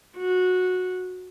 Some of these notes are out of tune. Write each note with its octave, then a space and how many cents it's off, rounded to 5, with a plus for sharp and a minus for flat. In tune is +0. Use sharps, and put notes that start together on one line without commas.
F#4 -15